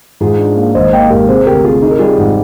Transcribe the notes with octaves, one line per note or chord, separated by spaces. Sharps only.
G#2 F4 G#4
D4
A#3
G#1 C5 D#5
A#3 D#5 G5
G#2 G4 A#4
C3 G#4 C5
D2 G4 A#4
C3 F4 G#4
D#4 G#4
A#4
G3 F4 G#4
G#2